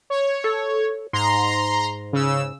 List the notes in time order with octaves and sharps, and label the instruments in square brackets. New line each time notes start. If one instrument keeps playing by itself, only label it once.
[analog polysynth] C#5
[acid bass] A4
[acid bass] G#2 [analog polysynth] A#5 C6
[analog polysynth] C#3 E6